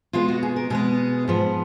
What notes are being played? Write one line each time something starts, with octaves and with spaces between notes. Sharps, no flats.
B2 G#3 B3 F4
F#4
G#4
A#4
B2 G#3 B3 G#4
G#2 F3 B3